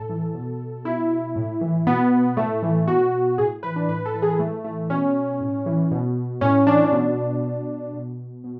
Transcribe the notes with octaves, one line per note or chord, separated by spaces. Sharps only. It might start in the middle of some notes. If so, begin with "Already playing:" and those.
Already playing: A2 A4
E3
B2
B2 E4
A2
E3
B2 B3
A2 A3
E3
B2 F#4
A2 G#4
E3 B4
D4
A2 B4
A4
E3
G#4
A2 A3
E3 A3
B2 C#4
A2
E3
B2
A2 C#4
E3 D4
B2 D4
B2
B2
B2